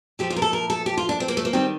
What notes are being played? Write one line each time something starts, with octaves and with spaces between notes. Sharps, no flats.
A#2 F3 A3 G4
F4
A#4
A4
A#4
A4
G4
F4
D4
C4
A#3
A3
A#3
D#3 G3 C4